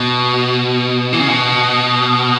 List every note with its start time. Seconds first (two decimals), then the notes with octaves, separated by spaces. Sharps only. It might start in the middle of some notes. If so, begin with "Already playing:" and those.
Already playing: B2
1.13 E3
1.20 C#3
1.28 B2